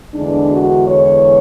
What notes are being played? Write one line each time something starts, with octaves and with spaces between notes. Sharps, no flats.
E2 D3 G#3 D4
F#4
C#5